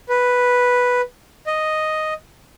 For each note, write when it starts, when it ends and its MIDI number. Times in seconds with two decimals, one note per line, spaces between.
0.09 1.01 71
1.47 2.14 75